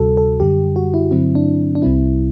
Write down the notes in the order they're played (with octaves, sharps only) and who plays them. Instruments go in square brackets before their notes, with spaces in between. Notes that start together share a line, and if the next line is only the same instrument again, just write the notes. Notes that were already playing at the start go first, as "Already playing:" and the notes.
Already playing: [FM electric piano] D2 C3 G3 F#4 A4
A4
F#2 D3 G3 G4
F#4
E4
G2 D3 F#3 C4 E4
D4
D4
C2 C3 G3 C4 E4